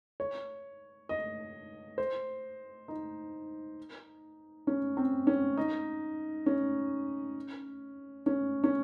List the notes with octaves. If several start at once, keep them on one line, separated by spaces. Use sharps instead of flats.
C#5
D#5
C5
D#4
C#4
C4
C#4
D#4
C#4
C#4
C#4